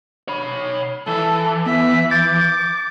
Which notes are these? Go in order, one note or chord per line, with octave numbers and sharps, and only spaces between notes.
C#5 B5
E3 A4
B3 E5
D6 G6 A6